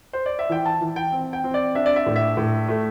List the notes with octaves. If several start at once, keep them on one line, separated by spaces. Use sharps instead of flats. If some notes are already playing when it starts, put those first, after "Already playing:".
C5
D5
E5
E3 G5
A5
E3
G5
C4
G5
C4
D5
D4 E5
D5
E5
A2
E5
A2
A3